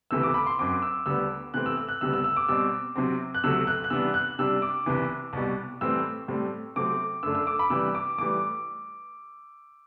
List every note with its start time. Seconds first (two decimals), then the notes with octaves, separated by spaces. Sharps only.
0.11 D2 C3 E3 A3 E6
0.23 D6
0.34 B5
0.46 C6
0.59 F#2 F#3 C4 D6
0.82 E6
1.06 D2 D3 G3 B3 E6
1.54 C3 E3 A3 C4 F#6
1.66 E6
1.77 E6
1.88 F#6
2.01 D2 C3 G3 B3 E6
2.13 E6
2.24 E6
2.36 D6
2.48 B2 G3 C4 E6
2.95 C3 F#3 C4
3.34 F#6
3.44 D2 C3 F#3 A3 E6
3.67 F#6
3.84 F#6
3.90 C3 E3 G3 B3 D4 E6
4.14 F#6
4.39 C3 G3 D4 E6
4.62 D6
4.86 C2 C3 E3
5.33 C2 B2 G3
5.81 A2 E3 G3 C4 E6
6.28 A2 G3 C4
6.76 C3 F#3 A3 C4 D6
7.23 F#2 D3 A3 D4 E6
7.35 E6
7.47 D6
7.59 B5
7.70 C3 E3 G3 E6
7.95 D6
8.18 A2 E3 G3 D6